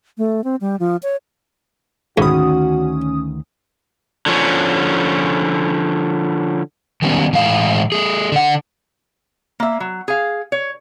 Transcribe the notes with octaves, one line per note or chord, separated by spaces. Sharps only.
A3
C4
G3
F3
C#5
D2 G#2 D#3 C#4 F#4 B5 D#6
D3 F3 C#4
D#3 G3 B3 C#4
A2 E3 G#3 F5
A3 G#4
D3 F#5
A#3 E5
F#3
G#4 F5
C#5